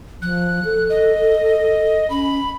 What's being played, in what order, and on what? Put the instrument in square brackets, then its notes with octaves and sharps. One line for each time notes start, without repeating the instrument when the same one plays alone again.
[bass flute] F3 [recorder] F#6
[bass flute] A4
[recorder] D#5
[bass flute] C#4 [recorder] B5